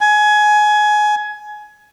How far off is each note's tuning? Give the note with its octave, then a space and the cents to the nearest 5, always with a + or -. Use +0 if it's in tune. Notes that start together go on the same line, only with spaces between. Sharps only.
G#5 +20